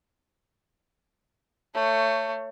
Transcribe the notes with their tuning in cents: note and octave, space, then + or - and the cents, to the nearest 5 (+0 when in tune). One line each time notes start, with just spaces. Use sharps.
A3 +25 C#5 +0